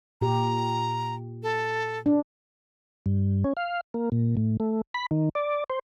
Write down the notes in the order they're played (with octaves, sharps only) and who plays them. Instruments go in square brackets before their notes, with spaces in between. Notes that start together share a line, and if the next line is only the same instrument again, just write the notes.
[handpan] A#2 G4 [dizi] A#5
[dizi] A4
[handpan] D4
[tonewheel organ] G2
C#4
F5
A#3
A#2
A2
A3
B5
D#3
D5
C5